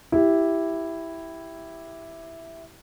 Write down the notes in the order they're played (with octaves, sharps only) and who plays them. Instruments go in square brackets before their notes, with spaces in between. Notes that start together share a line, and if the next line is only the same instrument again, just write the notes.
[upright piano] E4 G4